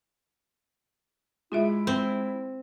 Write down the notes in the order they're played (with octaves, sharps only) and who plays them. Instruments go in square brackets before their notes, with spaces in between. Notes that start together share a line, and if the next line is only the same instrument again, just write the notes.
[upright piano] G#3 D7 [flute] E4 [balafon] F4 G#4 E5
[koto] C4